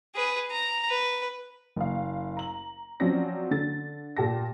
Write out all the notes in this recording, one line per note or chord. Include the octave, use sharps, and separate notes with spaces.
G#4 B4
A#5
B4
F#1 F5
A#5 F#7
F3 F#3 C4 C#4 D5 A#6
D3 A6
A#2 G4 A5 A#6